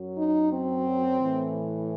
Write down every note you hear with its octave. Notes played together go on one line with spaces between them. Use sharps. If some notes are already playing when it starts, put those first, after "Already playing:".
Already playing: F#2 F#3
D#4
C4
A2 E3